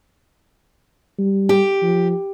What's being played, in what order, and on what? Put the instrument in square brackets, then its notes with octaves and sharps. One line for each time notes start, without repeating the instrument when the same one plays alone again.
[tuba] G3
[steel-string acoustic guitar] G4
[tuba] F3